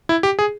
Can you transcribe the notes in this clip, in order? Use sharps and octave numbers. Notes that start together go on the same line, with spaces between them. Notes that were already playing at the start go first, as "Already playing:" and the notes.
E4
G4
G#4